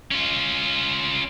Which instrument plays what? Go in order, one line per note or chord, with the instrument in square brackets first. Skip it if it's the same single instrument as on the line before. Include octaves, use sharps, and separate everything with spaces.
[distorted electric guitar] C#4 F4